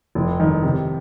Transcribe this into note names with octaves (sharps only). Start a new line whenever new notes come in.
F1
D#3
C3